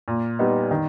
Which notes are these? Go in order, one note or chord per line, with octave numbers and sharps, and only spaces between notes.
A#2
G3 B3 D#4
D#3